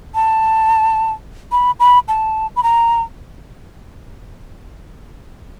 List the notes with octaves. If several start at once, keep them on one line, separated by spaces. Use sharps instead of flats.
A5
B5
B5
A5
B5
A#5